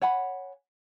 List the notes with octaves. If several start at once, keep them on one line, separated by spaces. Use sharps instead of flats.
C#5 F#5 G#5 B5